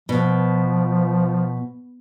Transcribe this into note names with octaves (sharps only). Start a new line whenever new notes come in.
B2 F3